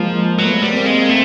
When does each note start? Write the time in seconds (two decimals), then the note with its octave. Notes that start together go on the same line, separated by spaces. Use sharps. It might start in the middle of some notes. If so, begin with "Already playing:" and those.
Already playing: F3 G#3 A#3
0.38 F#3 A3 B3
0.62 G3
0.74 A#3 C4
0.86 G#3
1.09 A3